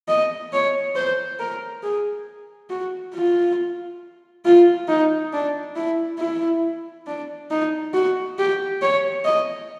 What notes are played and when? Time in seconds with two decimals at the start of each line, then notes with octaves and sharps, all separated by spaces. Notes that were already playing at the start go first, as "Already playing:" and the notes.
0.08 D#5
0.53 C#5
0.96 C5
1.39 A#4
1.83 G#4
2.70 F#4
3.14 F4
4.45 F4
4.88 D#4
5.33 D4
5.76 E4
6.19 E4
7.07 D4
7.51 D#4
7.94 F#4
8.38 G4
8.82 C#5
9.24 D#5